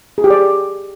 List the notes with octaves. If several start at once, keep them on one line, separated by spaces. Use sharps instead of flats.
G#4
G4
D5